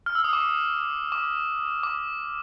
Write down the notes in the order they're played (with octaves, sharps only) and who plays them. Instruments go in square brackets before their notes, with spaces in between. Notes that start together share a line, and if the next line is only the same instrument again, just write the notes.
[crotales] F6
E6
D#6
D6
D6
D6